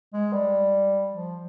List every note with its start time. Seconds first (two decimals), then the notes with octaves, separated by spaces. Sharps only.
0.13 G#3
0.33 G3
1.12 F3